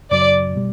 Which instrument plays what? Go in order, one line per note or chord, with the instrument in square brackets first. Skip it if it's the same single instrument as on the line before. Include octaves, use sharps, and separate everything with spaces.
[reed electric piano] F#2 C#3 F#3 [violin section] D5
[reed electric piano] B2 G3